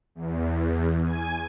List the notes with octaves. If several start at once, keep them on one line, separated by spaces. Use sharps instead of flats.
E2
G#5